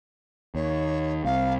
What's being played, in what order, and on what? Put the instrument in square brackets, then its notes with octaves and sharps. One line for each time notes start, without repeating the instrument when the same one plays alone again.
[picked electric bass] D#2 [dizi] C#5
[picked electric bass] C2 [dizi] F5